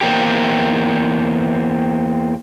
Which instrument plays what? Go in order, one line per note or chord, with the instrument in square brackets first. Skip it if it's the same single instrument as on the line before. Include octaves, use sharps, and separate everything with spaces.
[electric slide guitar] E2 E3 A#3 C4 G4